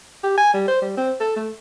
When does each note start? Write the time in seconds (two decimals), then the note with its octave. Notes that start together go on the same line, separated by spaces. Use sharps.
0.23 G4
0.38 G#5
0.54 G3
0.68 C5
0.82 G3
0.97 C4
1.20 A4
1.36 A3